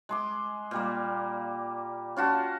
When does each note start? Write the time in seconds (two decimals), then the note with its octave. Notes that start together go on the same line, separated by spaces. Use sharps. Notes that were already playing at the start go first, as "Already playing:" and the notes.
0.09 G#3 C6 D6
0.71 A#2 G3 A#3
2.16 C#4 F4 F#4 A5